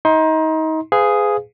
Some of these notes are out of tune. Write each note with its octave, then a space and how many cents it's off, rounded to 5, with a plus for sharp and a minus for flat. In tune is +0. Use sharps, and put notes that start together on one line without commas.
D#4 +30 C6 +15
G#4 +0 B4 +40 F5 +0